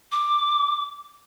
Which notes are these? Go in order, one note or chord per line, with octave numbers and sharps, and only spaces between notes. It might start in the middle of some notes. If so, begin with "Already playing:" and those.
D6